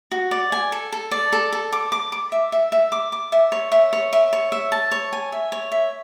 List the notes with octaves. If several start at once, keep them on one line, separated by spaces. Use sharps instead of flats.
F#4
D5
G#5
A4
A4
D5
A4
A4
D6
D6
D6
E5
E5
E5
D6
D6
E5
C#5
E5
C#5
E5
C#5
E5
A5
C#5
G#5
E5
C#5
E5